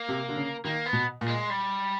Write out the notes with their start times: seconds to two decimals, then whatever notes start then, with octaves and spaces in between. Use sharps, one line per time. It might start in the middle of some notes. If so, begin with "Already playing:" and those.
Already playing: A#3
0.09 C3
0.29 D3
0.36 C#3
0.64 D#3 A#3
0.86 B3
0.93 B2
1.21 A#2
1.28 G#3
1.50 G3